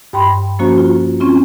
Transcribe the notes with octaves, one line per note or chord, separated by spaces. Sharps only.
G2 G5 B5 C6
F3 A#3 C#4 F#4 C5 A#5
F4
C4 C#4 F4